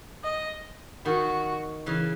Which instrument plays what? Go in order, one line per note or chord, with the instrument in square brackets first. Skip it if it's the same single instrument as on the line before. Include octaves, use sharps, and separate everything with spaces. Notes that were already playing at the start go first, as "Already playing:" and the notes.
[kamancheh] D#5
[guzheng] D#3 [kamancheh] F#4
[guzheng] C#3 E3